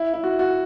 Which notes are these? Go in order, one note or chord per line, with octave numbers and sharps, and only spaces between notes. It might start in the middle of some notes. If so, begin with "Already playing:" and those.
Already playing: E4
E4
F#4
F#4